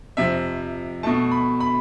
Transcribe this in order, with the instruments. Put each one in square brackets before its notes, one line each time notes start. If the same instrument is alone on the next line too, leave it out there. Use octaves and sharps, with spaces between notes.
[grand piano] F2 C3 F3 E5
B2 A3 A5
B5
B5